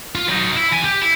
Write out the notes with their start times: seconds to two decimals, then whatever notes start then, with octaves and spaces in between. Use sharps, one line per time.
0.15 F4
0.29 F#3 D#4
0.57 E4
0.73 E2 G#5
0.84 G4
1.02 E4